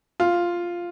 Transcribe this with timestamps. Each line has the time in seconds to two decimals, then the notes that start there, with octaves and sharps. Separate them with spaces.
0.20 F4